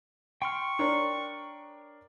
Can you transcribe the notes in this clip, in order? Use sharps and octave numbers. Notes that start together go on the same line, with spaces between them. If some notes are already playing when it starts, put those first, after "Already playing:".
G5 C6 C#6 F6
D4 A#4 C#5